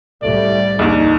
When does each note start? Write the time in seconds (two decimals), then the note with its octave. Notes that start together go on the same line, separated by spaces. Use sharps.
0.23 C2 A2 G3 A3 D5
0.79 A#1 D#2 D#4